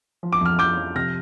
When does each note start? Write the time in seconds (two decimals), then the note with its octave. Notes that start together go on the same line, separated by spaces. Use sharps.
0.23 F3
0.33 D6
0.41 F2 F6
0.59 F3 D6 G6
0.78 F3
0.95 C3 F6 A#6